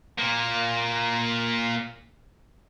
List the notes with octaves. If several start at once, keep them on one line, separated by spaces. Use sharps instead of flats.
A#2 A#3